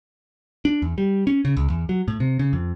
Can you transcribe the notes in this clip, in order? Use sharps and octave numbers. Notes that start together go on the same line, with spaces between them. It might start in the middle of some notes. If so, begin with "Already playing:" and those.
D4
E2
G3
C#4
C#3
C#2
E2
F#3
A2
C3
C#3
F2